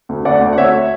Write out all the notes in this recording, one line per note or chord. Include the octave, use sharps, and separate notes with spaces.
D2
D2 D5 F#5
D2
F#5
D2 C#5 E5